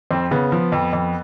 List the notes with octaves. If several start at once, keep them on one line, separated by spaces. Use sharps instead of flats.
F2 C4
C#3 B3
F3
F2
F2